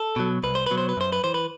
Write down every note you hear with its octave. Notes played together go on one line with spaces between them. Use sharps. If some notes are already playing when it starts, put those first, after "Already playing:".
Already playing: A4
B2 F#3
C2 B4
C5
B2 F#3 B4
C5
B4
F#2 C5
B4
E3 C5
B4